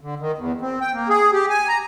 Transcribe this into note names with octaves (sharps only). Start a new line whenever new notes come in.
D3
D#3
E2
C4
G5
A#3
G#4
G4
G#5
A#5